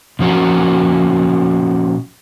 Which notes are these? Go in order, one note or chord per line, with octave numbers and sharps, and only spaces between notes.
A#2 F3 C#4 F#4 A#4